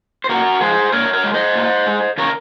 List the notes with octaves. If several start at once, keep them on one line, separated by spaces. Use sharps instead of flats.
C5
A#2 F#4 A#4
F3 G#3 G#4 C5
A#2 A#4 C#5
A#4 C#5
G#3
C5 D#5
A#2
G#3
C#3 A#4 C#5